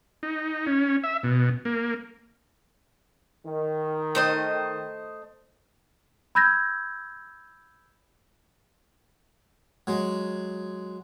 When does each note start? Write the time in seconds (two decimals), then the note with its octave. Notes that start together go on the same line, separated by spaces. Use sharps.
0.23 D#4
0.67 C#4
1.04 E5
1.23 B2
1.65 A#3
3.46 D#3
4.15 A3 C5 D#5
6.35 B5 E6 G6 G#6 A#6
9.87 F#3 G#3